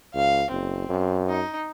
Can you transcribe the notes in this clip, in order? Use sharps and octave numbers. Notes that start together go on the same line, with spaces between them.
C#2 F5
F#1 C4
F#2
D#4